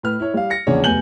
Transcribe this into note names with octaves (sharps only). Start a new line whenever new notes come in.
A2 B4 F6
E4 C#5
G3 F5
A#6 C#7
A#1 E2 C#3 D4 C#5
F1 D2 B3 G#5 G6 F#7